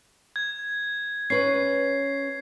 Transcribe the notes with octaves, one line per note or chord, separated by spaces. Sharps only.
G#6
C#4 B4 C#5 C7